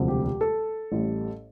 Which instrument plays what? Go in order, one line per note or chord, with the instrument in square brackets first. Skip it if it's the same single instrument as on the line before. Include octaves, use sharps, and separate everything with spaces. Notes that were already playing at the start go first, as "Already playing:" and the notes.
Already playing: [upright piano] E1 D2 C3 F3
G4
G4
A4
A1 A2 G3